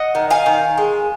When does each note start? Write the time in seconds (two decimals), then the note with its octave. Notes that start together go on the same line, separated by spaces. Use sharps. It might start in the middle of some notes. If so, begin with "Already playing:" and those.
Already playing: D#5 F#5
0.15 D#3
0.30 F5 G#5
0.46 D#3
0.78 G#3